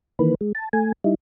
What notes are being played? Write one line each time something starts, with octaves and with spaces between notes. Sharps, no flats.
D#3 E3 A#3 B4
G#3
A5
A3 G#5
G3 D#4 E4